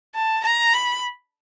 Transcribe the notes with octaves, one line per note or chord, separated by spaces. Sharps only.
A5
A#5
B5